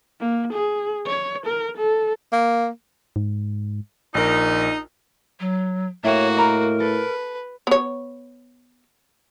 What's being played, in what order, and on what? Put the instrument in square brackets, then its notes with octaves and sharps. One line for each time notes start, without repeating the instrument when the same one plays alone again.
[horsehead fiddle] A#3
G#4
C#5
A#4
A4
[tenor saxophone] A#3
[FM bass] G#2
[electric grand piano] A#1 A#4 [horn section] D#4
[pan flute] F#3
[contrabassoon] A2 [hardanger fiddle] A#3 F#4 [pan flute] C#5 [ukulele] E5 G5
[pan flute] A#4 [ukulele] D#5 A#5 B5
[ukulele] A4 [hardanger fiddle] B4
[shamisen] B3 C#5